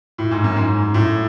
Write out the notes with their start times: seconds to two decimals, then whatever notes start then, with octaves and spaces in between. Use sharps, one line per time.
0.18 A2
0.31 G#2
0.44 F#2
0.56 G#2
0.94 A2